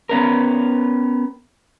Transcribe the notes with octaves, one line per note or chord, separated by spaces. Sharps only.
B3 C#4 A#4